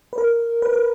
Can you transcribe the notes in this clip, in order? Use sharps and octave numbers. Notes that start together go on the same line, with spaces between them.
B4
A#4
B4
A#4